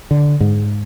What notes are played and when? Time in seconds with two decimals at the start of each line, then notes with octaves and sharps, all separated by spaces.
0.11 D3
0.40 G#2